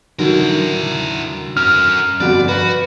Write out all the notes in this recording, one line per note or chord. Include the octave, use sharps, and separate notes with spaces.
D3 D#3 F#3 E4 A#4
C#4 A#4 F6
G1 F2 F#4 D5
F#4 B4